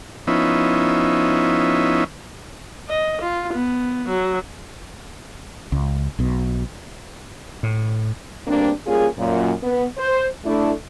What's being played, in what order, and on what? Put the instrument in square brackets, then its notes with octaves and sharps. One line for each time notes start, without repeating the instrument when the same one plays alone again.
[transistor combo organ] F3 B3 C#4 D#4 E4
[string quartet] D#5
F4
B3
F#3
[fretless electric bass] C#2
B1 B2
[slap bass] A2
[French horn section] D2 G2 A#3 C4 D4
G3 A#3 C#4 F4 G#4
F#2 A#2
B3
C5
A3 D4 E4